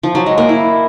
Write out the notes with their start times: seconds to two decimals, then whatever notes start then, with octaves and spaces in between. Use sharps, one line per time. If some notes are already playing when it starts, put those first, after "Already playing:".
0.03 F3
0.15 F#3
0.26 G#3
0.38 A#3
0.49 E4